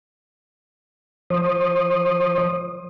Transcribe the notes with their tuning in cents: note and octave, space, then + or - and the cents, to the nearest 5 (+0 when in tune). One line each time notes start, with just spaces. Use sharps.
F3 +0 C5 +30 D#6 -15